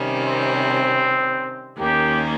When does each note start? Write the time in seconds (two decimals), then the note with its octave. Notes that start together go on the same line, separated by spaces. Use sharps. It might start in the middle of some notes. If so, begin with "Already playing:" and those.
Already playing: C3 D#3 G3 C#4
0.24 C4
1.78 D#2 D#3 A#3 C#4 G4